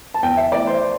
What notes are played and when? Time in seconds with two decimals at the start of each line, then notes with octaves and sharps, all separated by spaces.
0.14 A5
0.22 E2 G5
0.37 E5
0.52 E3 A3 D5
0.67 C5
0.82 C5